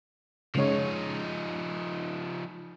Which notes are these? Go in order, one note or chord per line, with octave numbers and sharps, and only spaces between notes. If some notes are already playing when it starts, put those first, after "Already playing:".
C#3 F3 G#3 D#4 C#5